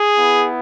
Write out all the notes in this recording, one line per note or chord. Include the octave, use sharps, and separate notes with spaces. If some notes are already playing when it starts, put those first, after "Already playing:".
Already playing: G#4
B3 E4